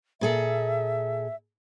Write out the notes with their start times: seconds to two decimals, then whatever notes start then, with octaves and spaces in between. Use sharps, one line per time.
0.21 A#2 G#4 A4 E5